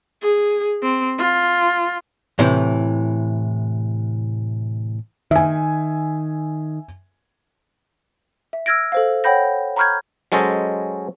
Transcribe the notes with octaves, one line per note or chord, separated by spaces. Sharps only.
G#4
C4
F4
A2 C3 E3
D#3 E5 G#5
E5
E6 F6 G#6 A#6 D7
A4 C5 F5
C#5 F#5 G5 B5 G6 A#6
A#5 B5 C#6 F6 G6 G#6
F#3 G#3 C#4 A4 C5 D#5